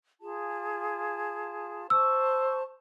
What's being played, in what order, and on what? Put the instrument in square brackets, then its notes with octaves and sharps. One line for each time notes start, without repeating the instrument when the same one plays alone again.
[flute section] F4 G#4 A5
[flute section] C5 A5 C#6 [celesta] E6